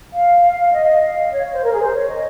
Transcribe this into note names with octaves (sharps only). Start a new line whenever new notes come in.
F5
F5
D#5
F5
C#5
C5
A#4
G#4
C5
C#5
D#5